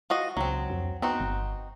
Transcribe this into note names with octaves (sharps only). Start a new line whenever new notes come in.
F4 F#4 D#5
C#2 F#3 C4
F2
B3 C4 D#4 F#4
G1